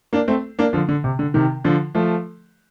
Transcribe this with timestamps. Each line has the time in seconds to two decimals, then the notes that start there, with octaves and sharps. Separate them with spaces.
0.13 A#3 D4
0.28 A3 C4
0.59 A#3 D4
0.73 D3 F3
0.89 D3
1.04 C3
1.19 D3
1.34 C3 D#3
1.64 D3 F3
1.95 F3 A3